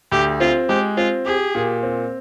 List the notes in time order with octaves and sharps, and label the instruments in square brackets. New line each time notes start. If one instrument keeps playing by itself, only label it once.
[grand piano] D2 [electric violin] G4
[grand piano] C4 [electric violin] F4
[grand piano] G#3 [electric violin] G4
[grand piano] C4 [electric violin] F4
[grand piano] G4 [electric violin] G#4
[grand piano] A#2
C4